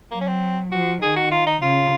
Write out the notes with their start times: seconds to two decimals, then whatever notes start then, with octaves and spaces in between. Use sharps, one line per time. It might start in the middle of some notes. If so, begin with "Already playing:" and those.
0.11 F#3 A#3
0.21 C#4
0.27 C4
0.72 F3 F#4
1.02 D#3 G#4
1.16 F#4
1.31 F4
1.46 D#4
1.61 C#3 F4